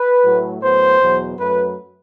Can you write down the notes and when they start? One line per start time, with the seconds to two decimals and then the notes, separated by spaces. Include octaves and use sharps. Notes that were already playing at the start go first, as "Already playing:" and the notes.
Already playing: B4
0.24 A2 F#3 A3
0.62 A2 F#3 B3 C5
1.00 E2 B2 F#3
1.38 F#2 F#3 A3 B4